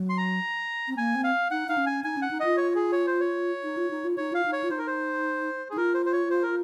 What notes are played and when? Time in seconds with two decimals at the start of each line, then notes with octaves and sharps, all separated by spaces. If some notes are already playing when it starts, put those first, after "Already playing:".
Already playing: F#3
0.09 C6
0.18 A#5
0.88 C4
0.97 A#3 G#5
1.15 C4
1.24 F5
1.51 D#4 F#5
1.69 D#4 F5
1.77 C#4
1.87 G#5
2.04 D#4 G#5
2.17 C#4 F#5
2.31 D#4
2.40 F4 D#5
2.57 C#5
2.75 G#4
2.92 C#5
3.07 C5
3.20 C#5
3.64 D#4
3.77 F4
3.91 D#4
4.05 F4
4.17 D#4 C#5
4.32 F4 F5
4.46 D#4
4.53 C#5
4.64 F4
4.71 D#4 C5
4.79 A#4
4.87 C5
5.70 D#4 G#4
5.77 F4 A#4
5.94 C5
6.06 C5
6.13 C#5
6.30 C5
6.43 A#4